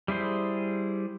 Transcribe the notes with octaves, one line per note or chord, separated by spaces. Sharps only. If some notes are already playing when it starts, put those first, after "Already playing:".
G3 E4 G#4 C5